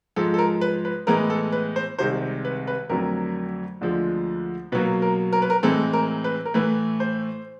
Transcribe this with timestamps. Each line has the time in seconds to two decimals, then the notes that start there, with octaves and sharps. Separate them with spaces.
0.16 G#2 F3 G#3 A4
0.34 A4
0.38 A#4
0.61 B4
0.85 B4
1.07 A2 E3 G#3 B3 A#4
1.30 A4
1.52 B4
1.76 C5
1.99 C2 C3 D#3 G#3 C5
2.45 B4
2.67 B4
2.89 F2 D3 F#3 A3 A#4
3.81 D2 D3 F3 G#3
4.72 B2 F#3 A#3 B4
5.02 A#4
5.33 A#4
5.42 B4
5.50 A#4
5.63 A2 E3 G#3 C4 A4
5.93 A#4
6.24 B4
6.45 A#4
6.54 A2 E3 A3 B4
7.00 C5